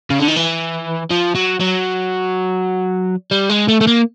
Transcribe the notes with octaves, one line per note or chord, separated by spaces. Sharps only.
C#3
D3
D#3
E3
F3
F#3
F#3
G3
G#3
A3
A3
A#3